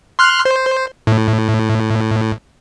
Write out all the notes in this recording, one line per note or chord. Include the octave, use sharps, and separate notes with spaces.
C6 F6 F#6
C5
A2